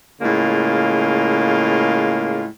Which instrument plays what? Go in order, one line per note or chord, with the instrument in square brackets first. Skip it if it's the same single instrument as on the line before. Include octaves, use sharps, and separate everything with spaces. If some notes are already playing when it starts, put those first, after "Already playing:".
[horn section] A2 C#3 G#3 A#3 F4